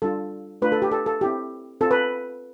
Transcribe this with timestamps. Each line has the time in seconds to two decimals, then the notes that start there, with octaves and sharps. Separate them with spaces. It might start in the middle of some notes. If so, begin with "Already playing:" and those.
0.02 G3 D4 F4 A4
0.62 A3 D4 F4 B4
0.72 A4
0.82 G4
0.91 A4
1.06 A4
1.21 C4 E4 G4
1.81 C4 F4 A4
1.91 B4